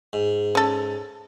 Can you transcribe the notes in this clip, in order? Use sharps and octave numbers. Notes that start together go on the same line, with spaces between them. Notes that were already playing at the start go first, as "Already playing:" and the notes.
G#2
C#4 A4